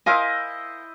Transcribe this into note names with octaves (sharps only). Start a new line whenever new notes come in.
E4 A#4 C5 D#5 F5 G#5